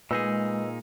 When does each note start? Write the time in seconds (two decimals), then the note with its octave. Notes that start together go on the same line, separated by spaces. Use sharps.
0.11 A#2 G#3 D#4 G#4 B4 D#5 E6